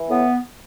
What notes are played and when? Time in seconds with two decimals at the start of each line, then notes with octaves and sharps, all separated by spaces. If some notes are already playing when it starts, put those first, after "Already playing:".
Already playing: E3
0.08 A2 B3